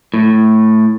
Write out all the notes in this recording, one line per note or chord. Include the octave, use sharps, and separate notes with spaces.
A2